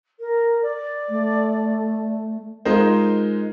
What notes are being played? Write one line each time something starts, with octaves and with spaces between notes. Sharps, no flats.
A#4
D5
A3
G#3 D#4 F4 A#4 C5